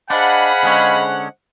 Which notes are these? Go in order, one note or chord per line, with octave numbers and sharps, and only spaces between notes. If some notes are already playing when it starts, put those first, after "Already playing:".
D4 G#4 C5 D#5 F5 F#5 G#5 B5
D3 G#3 C#4